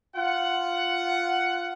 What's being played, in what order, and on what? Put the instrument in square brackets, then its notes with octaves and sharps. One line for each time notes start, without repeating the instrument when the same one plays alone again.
[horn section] F4 F#5